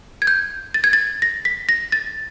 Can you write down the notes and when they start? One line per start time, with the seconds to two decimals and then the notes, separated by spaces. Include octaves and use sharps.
0.22 G#6
0.27 G6
0.74 A6
0.84 G#6
0.93 A6
1.22 A#6
1.45 B6
1.69 A#6
1.92 A6